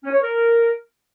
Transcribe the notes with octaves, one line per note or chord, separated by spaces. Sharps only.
C#4
C#5
A#4